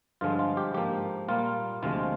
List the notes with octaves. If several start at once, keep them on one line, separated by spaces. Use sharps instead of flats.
G2 D3 F3 G#3 F4
F4
G4
G#2 F3 A#3 G4
A#2 G3 A#3 F4
D2 C3 F3 G#3 F4